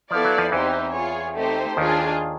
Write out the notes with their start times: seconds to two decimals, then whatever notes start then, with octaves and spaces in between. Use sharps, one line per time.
0.10 F3 B3 E4 A4 D5 F5
0.25 F#3
0.38 F2 F3
0.52 E2 E3 C4 D#4 G4 C5
0.94 F4 G#4 C#5
1.36 A3 C4 D#4 G4 C5
1.77 D#2 D#3 D4 F4 G#4